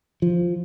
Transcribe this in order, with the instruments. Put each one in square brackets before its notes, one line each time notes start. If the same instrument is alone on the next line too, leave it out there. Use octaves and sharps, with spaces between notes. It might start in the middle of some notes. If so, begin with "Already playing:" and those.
[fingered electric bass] F3